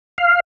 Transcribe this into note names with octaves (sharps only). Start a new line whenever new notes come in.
F5